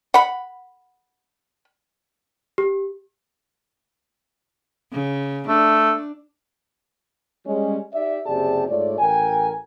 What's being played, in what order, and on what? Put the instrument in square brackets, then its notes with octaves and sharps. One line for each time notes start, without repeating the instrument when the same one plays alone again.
[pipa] F#5 B5
[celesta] G4
[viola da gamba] C#3
[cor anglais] A3 [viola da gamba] D4
[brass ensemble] G3 G#3 C#4
D#4 G4 D5 E5
F#1 C3 G4 G#4 D5 A5
G#2 A3 F4 C#5 D5
A1 A#4 G5 G#5